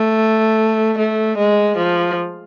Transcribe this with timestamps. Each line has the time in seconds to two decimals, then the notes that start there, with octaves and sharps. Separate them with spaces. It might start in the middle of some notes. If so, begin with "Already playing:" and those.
Already playing: A3
0.98 A3
1.38 G#3
1.77 F3